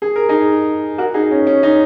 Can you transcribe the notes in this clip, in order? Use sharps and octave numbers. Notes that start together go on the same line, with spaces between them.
G#4
A#4
D#4 G#4
F#4 A#4
D#4 G#4
C#4
C#4
D#4